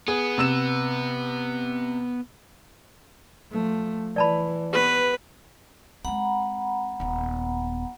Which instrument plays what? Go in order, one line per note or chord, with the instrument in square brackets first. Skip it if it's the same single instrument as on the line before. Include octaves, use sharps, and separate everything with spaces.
[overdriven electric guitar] B3 [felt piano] G#4
[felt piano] C3 E6 E7
[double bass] F3 A3
[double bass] E3 [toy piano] D5 A5 B5
[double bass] B3 [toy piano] G4 [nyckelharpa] B4
[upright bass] G#3 C4 [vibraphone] F#5 A#5 B5
[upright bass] D#1 B3